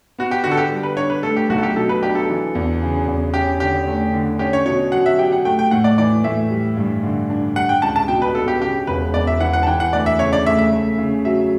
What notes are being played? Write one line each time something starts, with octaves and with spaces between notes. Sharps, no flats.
B3 F#4
G4
D3 F#4
A4
G4
G3
B4
D4 C#5
B4
A3 A4
G4
B1 F#4
A4
G4
B2 A4
B4
D4 G4
A4
E3
E2
C#3
E2
C#4 G4
D3 G4
A3
D3
C#4 G4
C#5
B2 C#5
F#3 F#5
E5
G4 G5
F#5
A3 G5
G5
A2 F#5
D5
E3 D5
A2 E5
G3
G2
D3
D4
G3 F#5
G5
C#2 A5
A5
B2 G5
B4
B3 A4
G4
C#3 G4
E1 B4
E2 D5
E5
E3 F#5
F#5
A5
E3 G5
F#5
D2 D5
E5
C#3 C#5
D5
A3 E5
E5
A3
C#3
F#3 E5